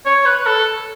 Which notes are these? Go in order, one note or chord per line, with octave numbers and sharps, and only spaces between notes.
C#5
B4
A4